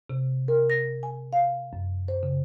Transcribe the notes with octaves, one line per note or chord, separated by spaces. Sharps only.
C3
A#4
A#6
G#5
F5
F#2
C5
C#3